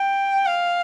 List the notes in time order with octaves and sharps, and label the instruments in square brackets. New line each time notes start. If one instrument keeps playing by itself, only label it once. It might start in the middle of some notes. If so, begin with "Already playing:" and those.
Already playing: [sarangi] G5
F5